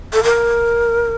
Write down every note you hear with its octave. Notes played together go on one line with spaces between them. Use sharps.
A4
A#4